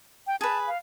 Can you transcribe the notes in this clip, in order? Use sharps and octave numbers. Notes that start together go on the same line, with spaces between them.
G5
G#4 B4 A5
F5